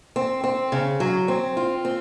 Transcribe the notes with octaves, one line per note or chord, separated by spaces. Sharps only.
C4
C4
C#3
F#3
C4
F4
C4